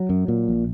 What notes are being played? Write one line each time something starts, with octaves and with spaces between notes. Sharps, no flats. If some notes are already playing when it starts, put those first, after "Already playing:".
Already playing: F#3
F#2
A#2
A#1